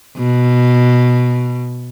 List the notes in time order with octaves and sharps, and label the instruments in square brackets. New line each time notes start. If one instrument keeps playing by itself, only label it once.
[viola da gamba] B2